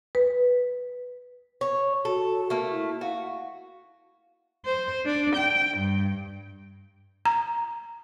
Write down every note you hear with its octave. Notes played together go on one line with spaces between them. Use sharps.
B4
C#5
F#4 A4
A3 A#3
E4
F#4 F5
C5
D4
G5
G2
A#5